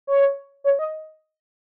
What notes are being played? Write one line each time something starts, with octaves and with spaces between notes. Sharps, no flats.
C#5
C#5
D#5